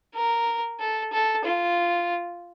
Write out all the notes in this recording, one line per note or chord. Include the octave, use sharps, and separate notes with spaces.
A#4
A4
A4
F4